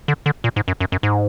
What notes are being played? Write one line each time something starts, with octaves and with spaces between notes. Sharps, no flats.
D3
D3
A#2
G#2
F#2
F#2
F#2
G#2